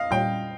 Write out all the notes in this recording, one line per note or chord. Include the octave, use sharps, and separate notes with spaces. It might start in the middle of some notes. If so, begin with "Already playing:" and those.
Already playing: D#5 F5
A#2 G3 C#4 F4 G5